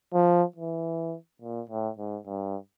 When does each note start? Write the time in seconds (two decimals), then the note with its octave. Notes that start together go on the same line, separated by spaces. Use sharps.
0.13 F3
0.56 E3
1.42 A#2
1.70 A2
1.98 G#2
2.26 G2